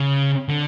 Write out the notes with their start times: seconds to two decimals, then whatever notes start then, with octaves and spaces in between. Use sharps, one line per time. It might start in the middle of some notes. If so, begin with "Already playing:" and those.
Already playing: C#3
0.49 D3